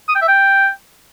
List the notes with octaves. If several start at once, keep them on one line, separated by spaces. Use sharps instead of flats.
D#6
G5
E5
G5